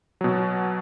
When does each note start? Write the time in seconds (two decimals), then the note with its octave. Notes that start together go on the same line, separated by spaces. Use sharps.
0.21 B2 F#3